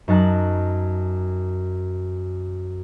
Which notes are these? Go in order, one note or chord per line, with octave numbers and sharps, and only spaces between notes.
F#2 D#4 A5 F#6